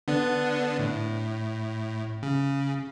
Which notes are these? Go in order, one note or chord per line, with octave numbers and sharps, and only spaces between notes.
D3 B3 D4
A2
C#3